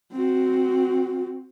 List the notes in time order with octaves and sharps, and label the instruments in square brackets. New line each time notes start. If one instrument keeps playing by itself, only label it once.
[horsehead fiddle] C4 F#4